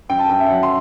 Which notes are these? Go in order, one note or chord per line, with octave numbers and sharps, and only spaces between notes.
F#2 G5
A5
F#2 G5
E5
F#3 F#5
C6